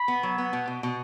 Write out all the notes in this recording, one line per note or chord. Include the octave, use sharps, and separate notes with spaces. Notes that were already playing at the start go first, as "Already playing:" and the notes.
Already playing: B5
B3
F#3
B3
B2
B2
B2